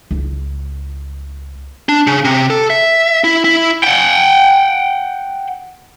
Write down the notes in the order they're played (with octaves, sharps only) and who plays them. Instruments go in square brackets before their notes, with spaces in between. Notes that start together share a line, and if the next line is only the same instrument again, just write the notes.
[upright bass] C#2 E4
[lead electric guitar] D4
C#3
C3
A4
E5
E4
E4
[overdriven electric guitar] F#5 G5